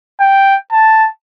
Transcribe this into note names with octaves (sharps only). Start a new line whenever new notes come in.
G5
A5